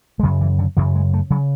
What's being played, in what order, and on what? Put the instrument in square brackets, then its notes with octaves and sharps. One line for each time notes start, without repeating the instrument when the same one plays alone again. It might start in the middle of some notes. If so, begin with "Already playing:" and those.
[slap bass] G#3
F#2 C#3 F#3
E3
D3
F#2 C#3 E3
G#3
A3
C#3 F#3